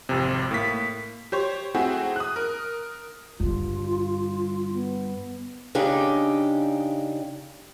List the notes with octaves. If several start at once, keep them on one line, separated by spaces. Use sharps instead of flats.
G#1 F2 C3
A2 A#3 B6
G4 C5 C#5
A3 C4 E4 F#4 G#4
D#6 F#6
A#4
G2 D3 F4
B3
C#3 D4 D#4 G4